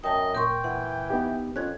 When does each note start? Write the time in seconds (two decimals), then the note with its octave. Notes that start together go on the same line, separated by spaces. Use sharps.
0.04 F#2 D#5 G5 A5
0.35 A#2 A#4 G5 C6 C#6
0.64 E3 F#5
1.10 B3 D#4 G4
1.56 F2 C#4 F#6 G#6